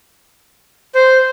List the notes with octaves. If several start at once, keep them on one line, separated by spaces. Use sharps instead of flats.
C5